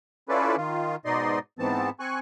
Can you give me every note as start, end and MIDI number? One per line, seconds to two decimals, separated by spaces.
0.29 0.56 61
0.29 0.56 64
0.29 0.56 65
0.29 0.56 69
0.29 0.56 71
0.29 0.56 74
0.57 0.96 51
0.57 0.96 65
1.05 1.39 44
1.05 1.39 47
1.05 1.39 63
1.05 1.39 74
1.05 1.39 75
1.05 1.39 84
1.59 1.90 44
1.59 1.90 52
1.59 1.90 59
1.59 1.90 60
1.59 1.90 81
2.00 2.19 60
2.00 2.19 80
2.00 2.19 85
2.00 2.19 90